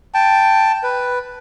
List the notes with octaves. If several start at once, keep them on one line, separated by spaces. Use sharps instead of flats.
G5 A5
B4